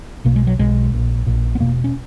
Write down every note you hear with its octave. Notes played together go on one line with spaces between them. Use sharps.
B1 B2 A#3
G#3
F#3
B1 B2 G#3
A#1 A#2
A#1 A#2
B3
E1 E2 B2 A#3
C#4